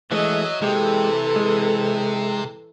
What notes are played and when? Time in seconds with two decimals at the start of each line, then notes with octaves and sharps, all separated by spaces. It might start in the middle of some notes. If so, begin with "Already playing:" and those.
0.12 E3 F#3 G#3 A3 D#5 E5
0.62 C3 E3 G#3 G4 A4
1.36 G#3